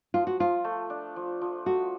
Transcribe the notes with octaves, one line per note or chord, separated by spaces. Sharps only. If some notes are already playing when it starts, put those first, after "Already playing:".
F3 F4
F#4
F3 F4
A3
D4
F3
F3
A3 F#4